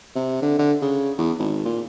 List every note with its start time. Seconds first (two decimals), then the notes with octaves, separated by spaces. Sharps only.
0.16 C3
0.42 D3
0.59 D3
0.82 C#3
1.18 E2
1.39 G#1
1.65 A#2